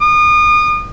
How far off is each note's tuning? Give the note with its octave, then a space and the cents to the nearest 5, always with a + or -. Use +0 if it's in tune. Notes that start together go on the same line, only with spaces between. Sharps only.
D#6 -35